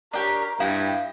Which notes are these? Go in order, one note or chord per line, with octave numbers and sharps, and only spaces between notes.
D4 G4 A#4 C#5
G2 E4 F5 G5